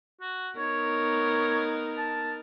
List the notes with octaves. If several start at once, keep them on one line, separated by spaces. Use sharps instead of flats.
F#4
B3 D#4 A#4 C#5
A5